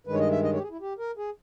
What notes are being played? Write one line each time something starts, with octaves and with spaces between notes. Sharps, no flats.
G2 D#3 G#3 B4
C#5
D#5
E5
D#5
C#5
G4
G#4
E4
G4
A#4
G#4